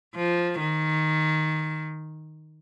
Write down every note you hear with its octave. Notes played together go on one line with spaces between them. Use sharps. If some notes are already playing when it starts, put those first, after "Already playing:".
F3
D#3